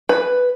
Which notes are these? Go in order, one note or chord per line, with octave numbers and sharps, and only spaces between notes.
B4